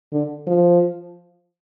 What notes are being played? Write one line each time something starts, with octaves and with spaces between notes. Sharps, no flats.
D3
F3